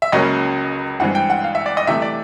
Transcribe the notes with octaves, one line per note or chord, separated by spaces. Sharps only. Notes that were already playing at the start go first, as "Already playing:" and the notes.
E5
C#2 C#3 F#3 A#3 C#4 D#5
G2 E3 G#3 C4 F#5
G5
F#5
F5
E5
D5
D#5
C3 E3 A3 E5
D5